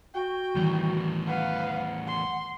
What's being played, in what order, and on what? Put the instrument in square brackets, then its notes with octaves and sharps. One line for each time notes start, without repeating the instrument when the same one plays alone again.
[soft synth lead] F#4 [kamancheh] G5
[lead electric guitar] E2 A2 [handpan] D#3 E3 G3
[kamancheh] B4 F5 [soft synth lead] F#5
[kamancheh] C6